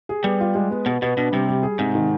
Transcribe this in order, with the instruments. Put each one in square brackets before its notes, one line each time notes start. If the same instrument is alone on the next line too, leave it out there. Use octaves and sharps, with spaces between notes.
[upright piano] G#4
[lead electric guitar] G3 [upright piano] B3
[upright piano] F4
G#3
B3
[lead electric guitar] B2 [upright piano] B3
[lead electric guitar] B2 [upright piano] B3
[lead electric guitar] B2 [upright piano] D4
[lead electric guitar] C3 [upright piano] G3
[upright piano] G3
G#4
[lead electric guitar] G#2 [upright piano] C3
[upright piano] D#3